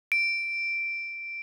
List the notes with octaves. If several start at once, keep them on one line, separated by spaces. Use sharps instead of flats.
D7